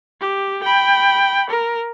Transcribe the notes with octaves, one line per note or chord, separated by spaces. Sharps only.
G4
G5 B5
A#4